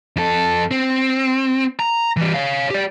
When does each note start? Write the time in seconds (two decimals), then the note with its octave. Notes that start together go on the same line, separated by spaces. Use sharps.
0.16 F2 A4
0.71 C4
1.80 A#5
2.17 E3 G3
2.34 C#5 F5
2.70 G4 D5